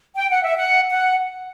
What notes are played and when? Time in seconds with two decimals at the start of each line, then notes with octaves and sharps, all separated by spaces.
0.16 G5
0.30 F#5
0.43 E5
0.57 F#5
0.90 F#5